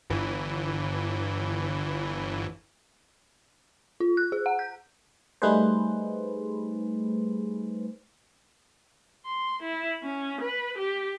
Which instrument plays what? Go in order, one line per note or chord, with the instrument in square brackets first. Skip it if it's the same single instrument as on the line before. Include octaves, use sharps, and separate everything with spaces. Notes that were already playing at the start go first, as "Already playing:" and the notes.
[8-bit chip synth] G1 E3
[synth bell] F4
F#6
G#4
F#5
G6
[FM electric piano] G3 A3 D#4 G#4 B4 C5
[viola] C6
E4
C#4
B4
G4